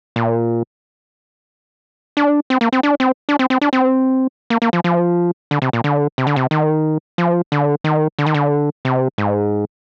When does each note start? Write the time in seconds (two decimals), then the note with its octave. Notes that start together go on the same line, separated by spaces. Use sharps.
0.16 A#2
2.17 D4
2.50 C4
2.61 A#3
2.73 C4
2.83 D4
3.00 C4
3.29 D4
3.39 C4
3.50 C4
3.61 D4
3.73 C4
4.50 A#3
4.62 A#3
4.73 F3
4.84 F3
5.51 D3
5.62 C3
5.73 A#2
5.84 D3
6.18 C3
6.27 D3
6.36 C3
6.51 D#3
7.18 F3
7.52 D3
7.84 D#3
8.19 D3
8.26 D#3
8.34 D3
8.85 C3
9.18 G#2